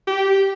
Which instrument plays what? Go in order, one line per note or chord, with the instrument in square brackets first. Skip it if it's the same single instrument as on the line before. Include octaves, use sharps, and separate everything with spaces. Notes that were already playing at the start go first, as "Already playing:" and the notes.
[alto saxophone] G4